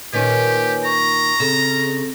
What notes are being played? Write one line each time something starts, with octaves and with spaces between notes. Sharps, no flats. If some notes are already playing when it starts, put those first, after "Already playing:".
A#2 D#3 C#4 G4 B4 C#5 G#5
A#5 C#6
C#3 C4 A4